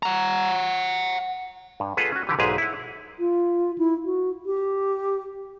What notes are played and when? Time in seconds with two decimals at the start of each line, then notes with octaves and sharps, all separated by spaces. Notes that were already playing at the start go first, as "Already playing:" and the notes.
0.03 F#5 A#5
1.80 G2
1.97 F4 G#4 A4 B4 F#5
2.12 C#4 F#4
2.27 D3 E3 G4
2.39 B1 G#2 G#3 G4 G#4 B4
2.58 E4 F#5
3.19 F4
3.78 E4
4.05 F#4
4.46 G4